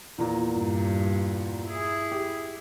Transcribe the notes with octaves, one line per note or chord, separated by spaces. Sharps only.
E2 A#2 A#5
G2
E4 G#4
G4